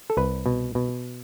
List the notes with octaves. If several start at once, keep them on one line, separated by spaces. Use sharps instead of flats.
A4
C2 B4
B2
B2